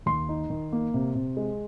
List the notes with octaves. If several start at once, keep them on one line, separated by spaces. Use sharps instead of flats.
D#2 C6
D#4
D#3
A#3
C3
C3
G#3